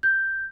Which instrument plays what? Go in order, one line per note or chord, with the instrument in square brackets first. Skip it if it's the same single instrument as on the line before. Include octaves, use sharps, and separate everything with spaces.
[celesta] G6